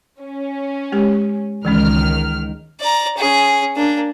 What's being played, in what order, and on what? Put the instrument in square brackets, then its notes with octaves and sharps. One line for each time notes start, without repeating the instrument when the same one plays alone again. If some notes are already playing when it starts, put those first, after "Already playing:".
[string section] C#4
[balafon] G#3 G4
[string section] C#2 D#3 F6 [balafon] E3 G#3 C#4
[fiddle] D5 A#5
C#4 G#4
A#3 D4